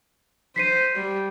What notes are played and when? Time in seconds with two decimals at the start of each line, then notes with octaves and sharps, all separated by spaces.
0.56 C5 B6 C7 D#7
0.95 G3